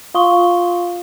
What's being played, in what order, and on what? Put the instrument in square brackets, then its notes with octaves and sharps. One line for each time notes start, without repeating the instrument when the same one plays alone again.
[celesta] F4 F5 C6 C#6 D#6 G7